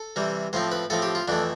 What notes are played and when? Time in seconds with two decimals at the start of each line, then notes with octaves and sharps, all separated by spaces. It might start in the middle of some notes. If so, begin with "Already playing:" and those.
Already playing: A4
0.16 C3 E3 G3
0.53 A2 F3 C4 C5
0.72 B4
0.90 A2 F3 C4 A4
1.02 G4
1.15 F4
1.28 F2 E3 A3 D4